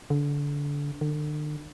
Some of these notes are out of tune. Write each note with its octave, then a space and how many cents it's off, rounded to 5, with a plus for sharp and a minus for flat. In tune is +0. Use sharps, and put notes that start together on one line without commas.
D3 -25
D3 +40